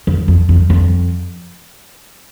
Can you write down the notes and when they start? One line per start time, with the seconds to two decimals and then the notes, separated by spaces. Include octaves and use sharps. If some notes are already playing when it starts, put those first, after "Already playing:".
0.07 F2
0.28 F2
0.49 F2
0.70 F2